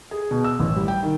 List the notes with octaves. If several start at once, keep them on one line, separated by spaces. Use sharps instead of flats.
G#4
B2
E6
A1
G3
G5
D#3